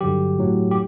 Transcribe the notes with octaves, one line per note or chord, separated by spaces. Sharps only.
G2 D3 F#3 G4
A2 F#3
G4